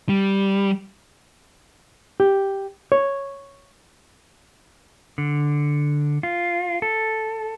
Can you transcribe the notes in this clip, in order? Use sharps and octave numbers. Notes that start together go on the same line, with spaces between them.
G3
G4
C#5
D3
F4
A4